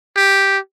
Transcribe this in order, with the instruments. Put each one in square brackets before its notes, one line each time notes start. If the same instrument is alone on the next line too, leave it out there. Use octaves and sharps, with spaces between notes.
[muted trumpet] G4